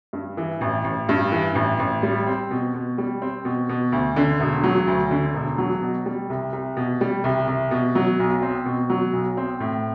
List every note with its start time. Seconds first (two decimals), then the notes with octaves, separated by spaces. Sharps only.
0.13 G2
0.37 E3
0.61 A1
0.84 A1
1.09 G2
1.32 E3
1.55 A1
1.79 A1
2.03 G3
2.27 C4
2.51 B2
2.74 B2
2.98 G3
3.22 C4
3.45 B2
3.69 B2
3.92 D2
4.16 D3
4.40 E1
4.64 F#3
4.87 D2
5.11 D3
5.34 E1
5.58 F#3
5.82 B2
6.06 G3
6.30 C2
6.53 C2
6.77 B2
7.01 G3
7.24 C2
7.47 C2
7.71 B2
7.95 F#3
8.19 B1
8.42 C4
8.66 B2
8.90 F#3
9.13 B1
9.37 C4
9.60 A2